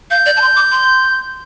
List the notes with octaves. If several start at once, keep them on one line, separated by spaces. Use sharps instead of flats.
F5 G6
D5
A5
C6
D6
C6